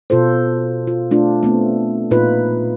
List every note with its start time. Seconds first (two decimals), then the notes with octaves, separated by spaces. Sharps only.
0.10 B2 F4 A4 C5
0.87 F4
1.11 A3 D4 F4
1.43 A3 B3 C4
2.11 A#2 D#4 F4 B4